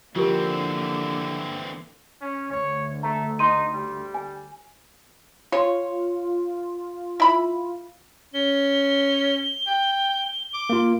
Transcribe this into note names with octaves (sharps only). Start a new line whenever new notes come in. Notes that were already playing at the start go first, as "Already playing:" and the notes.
D3 E3 F3 A#3 C4 F4 G4 A#4
C#4
D2 C#5
A3 A#5
D#4 C6 D#7
G3
G#5
F4 C#5
E4 B5
C#4 G7
G5
D6
A#3 F4